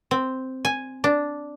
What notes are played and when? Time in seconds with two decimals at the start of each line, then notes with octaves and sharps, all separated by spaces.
0.11 C4
0.65 G#5
1.04 D4